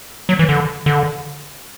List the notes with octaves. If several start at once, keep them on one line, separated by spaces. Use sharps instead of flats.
F#3
E3
D3
D3